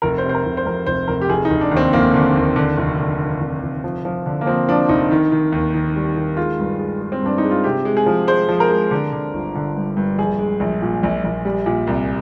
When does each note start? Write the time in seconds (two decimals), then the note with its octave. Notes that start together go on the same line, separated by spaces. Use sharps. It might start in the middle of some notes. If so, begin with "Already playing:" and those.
0.02 F1 A#4
0.18 C5
0.24 C3
0.29 C5
0.35 A#4
0.45 F1
0.57 C5
0.66 F2 A#4
0.86 F1 C5
1.08 F1 A#4
1.21 G4
1.29 F1 G#4
1.45 D#4
1.51 F1
1.61 D4
1.71 D#2
1.77 C4
1.93 F1 A#3
2.14 D3
2.36 D#2
2.56 D3
2.77 F1
2.99 D3
3.21 D3
3.40 F1
3.63 F1
3.84 F3
4.05 F3
4.26 D3
4.41 A#3
4.46 F3 C4
4.68 F3 D4
4.89 F1 D#4
5.11 D#3
5.32 D#3
5.52 D#2
5.74 D#3
5.96 G3
6.17 D#3
6.37 G#3 F4
6.59 G2
6.79 G#3
7.01 G#3
7.12 C4
7.22 G2 D4
7.38 D#4
7.44 G#3
7.51 F4
7.64 C3 G4
7.85 G#3
7.97 G#4
8.06 F3
8.27 G#3 C5
8.49 F3
8.60 A#4
8.70 G#3
8.91 D3
9.12 D3
9.33 G1
9.55 D3
9.76 G2
9.97 G2
10.18 A#1 G#4
10.39 G#3
10.60 A#1
10.82 A#2
11.03 A#1
11.24 A#1
11.45 G3
11.66 A#2
11.87 C2